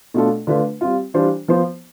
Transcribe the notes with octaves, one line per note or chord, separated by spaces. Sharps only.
B2 A3 D4 F4 A4
D3 A3 D4 F4 B4
G3 C4 F4
E3 G3 D4 F4 C5
F3 B3 F4 C5